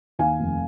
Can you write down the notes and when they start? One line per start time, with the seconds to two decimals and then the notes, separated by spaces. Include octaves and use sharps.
0.19 D#2 F5 G#5
0.40 F1